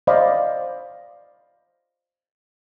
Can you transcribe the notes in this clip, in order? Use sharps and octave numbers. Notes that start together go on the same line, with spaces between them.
C5 D5 D#5 F5 B5